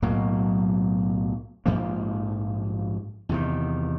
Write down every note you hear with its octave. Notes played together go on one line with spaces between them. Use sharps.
B1 A2 F#3 A#3
A#1 G#2 F3 A#3
E2 C3 D#3